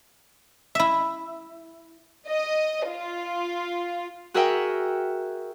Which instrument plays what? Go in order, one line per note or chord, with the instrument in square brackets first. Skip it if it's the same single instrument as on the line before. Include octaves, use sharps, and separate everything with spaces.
[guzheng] E4 E5
[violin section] D#5
F4
[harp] F#4 G#4 A#4 E5 F#5 G5